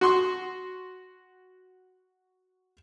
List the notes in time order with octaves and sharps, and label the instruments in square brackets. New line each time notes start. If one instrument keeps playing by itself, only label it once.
[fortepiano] F#4 C6 C#6